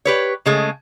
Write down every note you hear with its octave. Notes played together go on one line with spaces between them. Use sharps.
G4 B4 C#5
C#3 G#3 A3